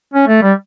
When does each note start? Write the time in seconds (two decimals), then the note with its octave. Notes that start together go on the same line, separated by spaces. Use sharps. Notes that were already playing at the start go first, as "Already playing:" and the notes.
0.14 C#4
0.28 A3
0.43 G3